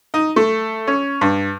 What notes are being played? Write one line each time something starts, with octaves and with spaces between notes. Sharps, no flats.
D#4
A3
C#4
G2